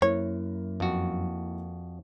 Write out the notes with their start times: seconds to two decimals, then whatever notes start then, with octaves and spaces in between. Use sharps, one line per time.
0.02 F#2 A#3 E4 A#4 C#5
0.80 F2 F#4